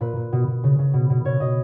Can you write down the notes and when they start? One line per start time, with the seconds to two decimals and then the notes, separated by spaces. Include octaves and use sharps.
0.01 A#2 B4
0.16 A#2
0.32 B2
0.47 B2
0.64 C#3
0.79 C#3
0.94 B2
1.10 B2
1.25 B2 C#5
1.40 B2 D#5